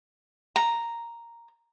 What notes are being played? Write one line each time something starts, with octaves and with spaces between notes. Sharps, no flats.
A#5